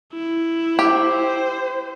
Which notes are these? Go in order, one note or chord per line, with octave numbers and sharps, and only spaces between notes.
E4
G4 C5